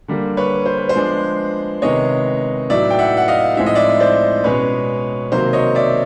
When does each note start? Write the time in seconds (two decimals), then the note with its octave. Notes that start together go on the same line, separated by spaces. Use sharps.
0.08 D3 G3 A#3
0.37 B4 C#5
0.66 C5
0.78 B4
0.89 C5
0.95 F3 G#3 B3 D4
1.82 C3 D#3 G#3 B3 C#5 D#5
2.70 A2 F#3 B3 D#4 D5 E5
2.90 G5
2.99 E5 F#5
3.17 F#5
3.28 D#5 F5
3.57 A2 F3 G#3 C4 D#4 E5
3.66 D#5
3.75 D5 E5
4.00 C5 D5
4.44 B2 G#3 C#4 B4 C#5
5.32 C3 D#3 F#3 A#3 C5
5.53 C#5 D#5
5.75 D5 E5